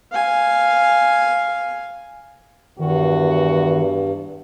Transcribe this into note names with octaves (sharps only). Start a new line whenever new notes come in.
F5 G#5
E2 G2 D#3 F#4